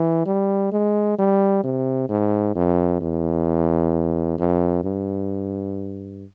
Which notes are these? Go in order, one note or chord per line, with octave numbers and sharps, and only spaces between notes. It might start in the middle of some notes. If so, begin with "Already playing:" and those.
Already playing: E3
G3
G#3
G3
C3
G#2
F2
E2
F2
G2